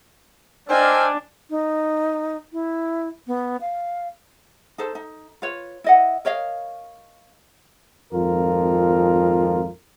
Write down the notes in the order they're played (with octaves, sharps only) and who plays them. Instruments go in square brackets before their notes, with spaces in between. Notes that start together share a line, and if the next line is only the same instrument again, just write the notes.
[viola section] D4 [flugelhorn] C5 [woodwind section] D#5 E6 F6 [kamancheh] G5 G#5
[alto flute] D#4
E4
B3
F5
[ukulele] D#4 A4 C5
D#4
F4 B4 C#5
E4 D#5 F#5
A#4 C#5 D#5 F5
[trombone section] G#1 F2 F4 A#4